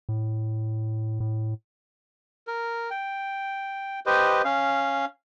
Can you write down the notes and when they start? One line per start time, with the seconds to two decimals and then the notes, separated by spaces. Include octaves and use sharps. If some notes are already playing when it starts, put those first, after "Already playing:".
0.09 A2
1.20 A2
2.47 A#4
2.91 G5
4.06 G4 B4 C5 D#5
4.45 C#4 F5